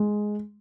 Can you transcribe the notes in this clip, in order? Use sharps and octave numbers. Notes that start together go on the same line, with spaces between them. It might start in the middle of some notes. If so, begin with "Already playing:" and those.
Already playing: G#3